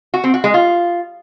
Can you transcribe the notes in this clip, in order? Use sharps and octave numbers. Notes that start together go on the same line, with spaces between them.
F#4
C4
F#4
G#3
F4